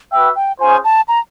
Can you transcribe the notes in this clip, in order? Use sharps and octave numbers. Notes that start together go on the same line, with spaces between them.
F#4 B4 E5 G5
G5
C#4 F4 G#4 C5 G#5
A5
A#5